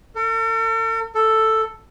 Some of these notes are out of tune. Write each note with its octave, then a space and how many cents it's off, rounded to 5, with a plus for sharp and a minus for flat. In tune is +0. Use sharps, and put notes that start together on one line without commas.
A4 +45
A4 +5